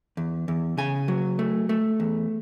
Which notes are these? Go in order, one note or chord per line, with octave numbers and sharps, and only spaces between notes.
E2
E2
C#3 G#5
F#3
A3
A3
E2